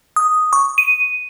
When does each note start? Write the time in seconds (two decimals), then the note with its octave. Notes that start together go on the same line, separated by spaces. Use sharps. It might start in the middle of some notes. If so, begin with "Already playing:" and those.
0.16 D#6
0.53 C#6
0.78 D#7